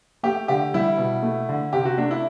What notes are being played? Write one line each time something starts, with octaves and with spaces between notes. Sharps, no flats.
A3 G4
D3 G4
G3 E4
B2
A3
D3
C3 G4
F#4
A3 D4
E4